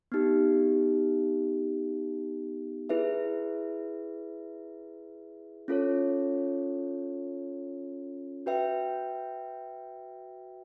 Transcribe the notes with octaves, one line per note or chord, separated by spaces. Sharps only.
B3 D#4 G4
E4 G#4 B4 E5
C#4 F4 A4 C#5
F#4 B4 E5 G5